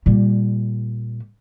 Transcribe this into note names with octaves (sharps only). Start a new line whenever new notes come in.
A#2 G3